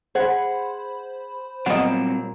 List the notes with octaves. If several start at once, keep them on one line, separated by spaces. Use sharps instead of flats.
G#4 C5 F#5 B5
A#2 F#3 G3 B3 C4 D#5